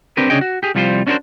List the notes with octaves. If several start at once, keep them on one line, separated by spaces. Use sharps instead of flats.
C4 D4 G4 A#4 B4
C#3 C#4 D4 G#4 D#5 G5
F#4
G4 G#4
C2 F3 G3 F4 F#4 C5
C#4 D4 F#4 A4 A#4 C5